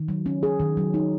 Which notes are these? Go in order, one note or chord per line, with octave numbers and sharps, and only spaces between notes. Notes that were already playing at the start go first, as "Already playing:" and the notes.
Already playing: D#3
F#3
C#4
G#4
D#3
F#3
D#4